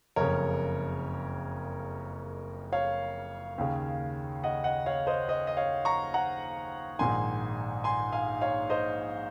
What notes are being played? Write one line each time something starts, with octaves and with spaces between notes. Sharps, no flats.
F#1 F2 C#3 A#4 C#5
C#5 F5
D#2 C#3
D#5 F#5
D#5 F#5
C#5 F5
C5 D#5
C5 D#5
D#5
C#5 F5
A#5 C#6
F#5 A#5
A#1 G#2 D#3 G#5 C6
G#5 C6
F5 G#5
C#5 F5
C5 D#5